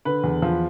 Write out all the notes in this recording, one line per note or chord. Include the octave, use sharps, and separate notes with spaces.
D3 B4
E2
F3